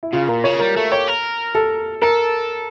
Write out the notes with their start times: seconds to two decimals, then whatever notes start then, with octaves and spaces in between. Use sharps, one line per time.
0.03 E4
0.13 C#3 F4
0.28 A#2 A#4
0.44 C#3 C#5
0.59 G3 A#4
0.76 A3 A4
0.91 G4 C#5
1.07 A#4
1.55 A4
2.02 A4 A#4